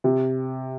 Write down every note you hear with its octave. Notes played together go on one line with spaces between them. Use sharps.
C3